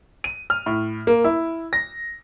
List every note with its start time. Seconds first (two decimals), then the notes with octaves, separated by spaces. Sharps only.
0.24 D#7
0.50 F6
0.66 A2
1.07 A#3
1.24 E4
1.73 A#6